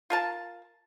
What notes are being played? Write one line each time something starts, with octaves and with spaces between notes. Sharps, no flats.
F4 A#4 A5